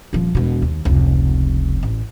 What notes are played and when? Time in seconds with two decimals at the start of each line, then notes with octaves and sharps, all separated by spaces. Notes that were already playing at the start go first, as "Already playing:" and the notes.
0.13 D#1 F3
0.35 E1 B2
0.62 D#2
0.85 F1 C#2
1.83 A1